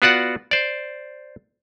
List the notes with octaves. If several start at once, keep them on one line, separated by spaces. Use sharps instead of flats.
B3 F4 F#4 D5 F#5
C5 D5